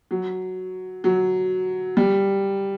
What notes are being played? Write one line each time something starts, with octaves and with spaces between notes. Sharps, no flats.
F#3
F#3
G3